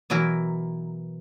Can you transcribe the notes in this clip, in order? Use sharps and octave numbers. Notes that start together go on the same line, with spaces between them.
B2 E3 F#3 E4 A#4